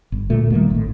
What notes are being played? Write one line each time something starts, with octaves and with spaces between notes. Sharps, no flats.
G1
D2 A#2 A3
D#3 G3 A3 A#3
G#1 A2